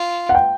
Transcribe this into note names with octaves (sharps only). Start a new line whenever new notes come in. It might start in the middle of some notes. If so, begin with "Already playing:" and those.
Already playing: F4
F#5
G5